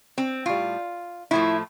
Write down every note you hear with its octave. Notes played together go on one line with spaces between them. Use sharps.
C4
A2 G3 F4
A2 F3 A3 E4